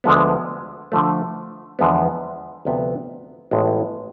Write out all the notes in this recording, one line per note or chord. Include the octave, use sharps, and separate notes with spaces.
D2 D3 F3 G#3 B3
D3 F3 A3
E2 D3 F3 G#3 B3
D2 C3 F3 B3
A1 A2 G#3 B3 F4